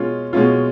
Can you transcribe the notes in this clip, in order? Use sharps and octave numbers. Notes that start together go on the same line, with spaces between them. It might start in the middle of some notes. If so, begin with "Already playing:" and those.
Already playing: B2 G#3 C#4 F4
B2 G#3 C#4 F4